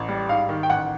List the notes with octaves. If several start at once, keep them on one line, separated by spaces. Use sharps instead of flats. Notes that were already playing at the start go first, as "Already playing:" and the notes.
Already playing: A1
G3
G#2 F5
D#3
G5
A1 F#5